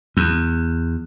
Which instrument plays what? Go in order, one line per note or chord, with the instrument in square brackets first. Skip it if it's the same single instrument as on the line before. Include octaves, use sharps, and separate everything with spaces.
[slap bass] E2